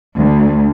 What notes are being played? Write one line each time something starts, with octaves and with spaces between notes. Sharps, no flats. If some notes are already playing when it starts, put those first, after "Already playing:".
D2